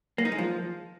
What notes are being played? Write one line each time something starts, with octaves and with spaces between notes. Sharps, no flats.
A#3
D#4
G#3
F3